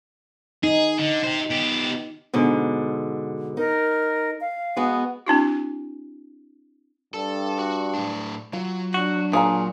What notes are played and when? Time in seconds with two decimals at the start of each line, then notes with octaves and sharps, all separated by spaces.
0.63 D#4 G#4
0.98 D3
1.23 G4 C5
1.50 B3 G4
2.34 G#2 B2 D3
3.57 D#4 A#4
4.41 F5
4.77 G#3 B3 F#4
5.27 C4 D4 E4 F#4
7.14 G2 A4
7.59 F#4
7.94 A2 D4
8.53 F#3 F4
8.94 D4 F#4
9.33 A#2 G#4 F5 A#5